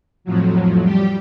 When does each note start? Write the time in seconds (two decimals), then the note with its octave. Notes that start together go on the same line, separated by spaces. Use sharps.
0.24 F2 A2 F3 F#3
0.82 G3 G4